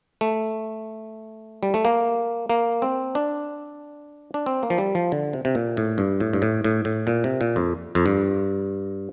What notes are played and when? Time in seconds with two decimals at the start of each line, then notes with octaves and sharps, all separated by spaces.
0.21 A3
1.63 G3
1.74 A3
1.85 A#3
2.50 A#3
2.82 C4
3.15 D4
4.34 D4
4.46 C4
4.63 A#3
4.70 F3
4.78 G3
4.95 F3
5.12 D3
5.33 C3
5.45 C3
5.55 A#2
5.77 A2
5.98 G2
6.20 A2
6.33 G2
6.42 A2
6.64 A2
6.85 A2
7.07 A#2
7.24 C3
7.41 A#2
7.56 F2
7.95 F2
8.06 G2